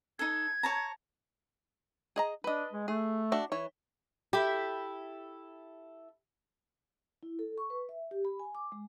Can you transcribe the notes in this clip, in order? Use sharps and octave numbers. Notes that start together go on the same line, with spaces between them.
D#4 A4 G#6
C#5 A5 A#5
G#4 D#5 A#5
D4 B4 D#5
G#3
A3 G#4
D4 F#4 E5
E3 C#5
E4 G4 A4 B5
E4
A4
C#6
B4
E5
G4
B5
G#5
D6
G#3